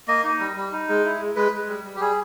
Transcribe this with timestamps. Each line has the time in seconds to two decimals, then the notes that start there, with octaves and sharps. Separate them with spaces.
0.08 A#3 D#5
0.24 D#4
0.40 G3
0.56 G3
0.72 D#4
0.89 G#3
1.05 E4
1.21 G#3
1.36 G#3 B4
1.52 G#3
1.68 G3
1.84 G3
1.96 G4
2.00 G3 G#4